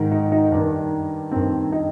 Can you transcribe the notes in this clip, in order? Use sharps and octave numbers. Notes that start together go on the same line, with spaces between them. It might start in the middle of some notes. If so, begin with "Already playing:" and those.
Already playing: G#2 D#3
D#4
D#4
G2 D#3 D4
G2 D#3 C4
D#4